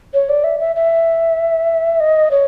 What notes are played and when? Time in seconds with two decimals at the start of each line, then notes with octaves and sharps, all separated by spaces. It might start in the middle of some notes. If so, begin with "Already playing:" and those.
0.14 C#5
0.29 D5
0.44 E5
0.60 E5
0.76 E5
2.00 D#5
2.31 C#5